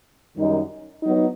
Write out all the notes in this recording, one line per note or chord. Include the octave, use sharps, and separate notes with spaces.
F#2 D#3 G3 D#4
F#3 B3 D#4